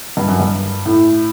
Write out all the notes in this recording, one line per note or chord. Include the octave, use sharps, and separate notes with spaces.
G2
F#2
G2
A2